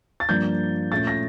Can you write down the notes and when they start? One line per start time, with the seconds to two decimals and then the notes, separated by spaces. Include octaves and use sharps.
0.20 A6
0.29 G2 F3 A#3 D4 G6
0.92 A#2 A3 C#4 A6
1.07 A#6